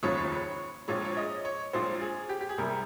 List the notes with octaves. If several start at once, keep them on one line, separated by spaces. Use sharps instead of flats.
F1 D#2 C#3 F3 C#5
A#1 A#2 F3 G#3 C#5
C#5
D#5
C#5
A#1 A#2 F3 G#3 C5
G#4
G4
G4
G#4
C2 C3 G3 A#4